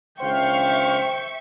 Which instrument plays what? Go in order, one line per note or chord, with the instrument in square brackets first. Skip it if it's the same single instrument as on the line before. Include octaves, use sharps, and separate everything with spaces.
[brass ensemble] C#2 D4 F5 [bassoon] C5 [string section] E5 C#6 [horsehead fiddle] G5